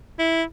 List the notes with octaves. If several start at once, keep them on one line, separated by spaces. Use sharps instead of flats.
E4